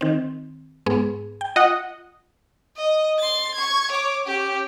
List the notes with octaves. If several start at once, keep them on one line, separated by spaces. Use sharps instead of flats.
D#3 C4
G#2 B3 G#4
G5
F4 D#5 F#5
D#5
C6 A6
C#6 G#6
C#5 D6
C#4 G4